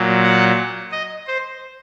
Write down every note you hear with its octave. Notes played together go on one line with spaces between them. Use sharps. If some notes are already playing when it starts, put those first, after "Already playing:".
Already playing: A#2 F#3
F#5
D#5
C5